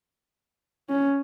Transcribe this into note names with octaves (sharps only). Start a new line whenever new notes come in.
C#4